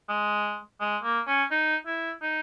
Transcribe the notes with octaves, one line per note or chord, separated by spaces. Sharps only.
G#3
G#3
A#3
C#4
D#4
E4
D#4